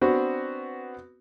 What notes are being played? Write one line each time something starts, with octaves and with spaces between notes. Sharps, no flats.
B3 C4 D4 F#4